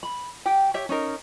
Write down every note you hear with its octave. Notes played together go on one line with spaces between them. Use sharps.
B5
G4 G5
G4 C#5 E5
C#4 D#4 A#4